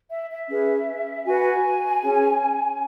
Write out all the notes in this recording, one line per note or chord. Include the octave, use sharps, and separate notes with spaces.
E5
E5
C#4 G#4 B4
F#4 B4 G#5
C#4 G#4 C#5